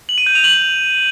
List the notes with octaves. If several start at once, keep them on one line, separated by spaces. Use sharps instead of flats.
F#7
D#7
G6
F7
F#7